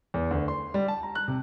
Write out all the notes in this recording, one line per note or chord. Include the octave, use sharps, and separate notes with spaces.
E2
D2
C6
G3
A5
A#5
F#6
C3